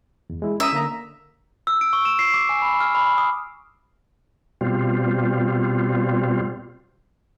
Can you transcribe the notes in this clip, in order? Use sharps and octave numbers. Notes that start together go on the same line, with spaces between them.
E2
G#3 E4
C#4 E5 A#5 D#6
D3 A#3 A#5
E6
D7
C#6
E7
C7
D6
G#5
B5
F6
B5
D#6
B2 G3 C4 F4